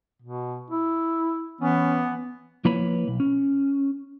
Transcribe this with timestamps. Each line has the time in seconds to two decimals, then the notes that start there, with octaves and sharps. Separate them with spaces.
0.22 B2
0.71 E4
1.61 E3 B3 C#4
2.65 F3 A#3 E4 B4 C#5 B5
3.08 B1
3.20 C#4